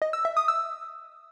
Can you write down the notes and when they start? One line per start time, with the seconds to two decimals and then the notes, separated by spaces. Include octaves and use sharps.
0.02 D#5
0.13 E6
0.25 E5
0.37 D#6
0.48 E6